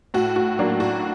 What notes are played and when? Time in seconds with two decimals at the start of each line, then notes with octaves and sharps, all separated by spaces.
0.14 A2 F#4
0.36 F#4
0.59 F#3 A#3 D4
0.80 F#4